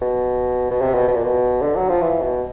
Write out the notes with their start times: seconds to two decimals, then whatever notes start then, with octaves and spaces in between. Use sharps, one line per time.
0.01 B2
0.71 B2
0.81 C3
0.95 B2
1.08 B2
1.16 A#2
1.24 B2
1.62 D3
1.76 F#3
1.89 F3
2.02 E3
2.22 B2